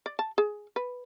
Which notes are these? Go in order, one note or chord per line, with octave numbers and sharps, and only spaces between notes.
D5
A5
G#4
B4